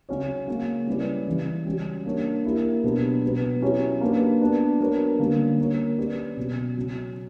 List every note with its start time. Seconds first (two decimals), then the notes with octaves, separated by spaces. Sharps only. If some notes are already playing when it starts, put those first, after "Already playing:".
0.09 C#3 F#3 C#4 F#4 C#5
0.48 C#3 F#3 A#3 C#4
0.87 G3 C#4 E4 B4 D5
1.27 C#3 E3 G3
1.66 G3 C#4 F#4
2.05 A#3 D4 A#4 C#5
2.44 A#3 E4 G4 A#4
2.84 B2 F#3 B3 D4 G4
3.23 B2 F#3 B3
3.62 F#3 C#4 E4 G4 C#5
4.01 A#3 D4 G4 B4
4.41 B3 D4 F#4
4.80 F#3 B3 D4 A#4 C#5
5.19 D3 G3 A#3 C#4 G4
5.59 A#3 D4 F#4 A#4 C#5
5.98 F#3 C#4 G4 B4 D5
6.37 B2 F#3 C#4
6.76 C#3 F#3 C#4